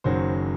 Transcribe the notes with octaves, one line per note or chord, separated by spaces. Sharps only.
F#1 F#2 D#3 F#3 C5